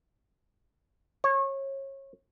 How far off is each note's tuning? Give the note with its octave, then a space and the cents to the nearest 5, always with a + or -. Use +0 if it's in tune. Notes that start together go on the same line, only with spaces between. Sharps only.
C#5 -30